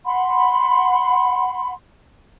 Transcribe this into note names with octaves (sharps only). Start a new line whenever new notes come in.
F#5 B5 C6